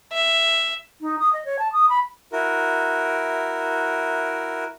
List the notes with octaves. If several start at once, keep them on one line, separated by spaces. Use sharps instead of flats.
E5
D#4
D#6
D#5
C#5
A5
D#6
B5
E4 F#4 A#4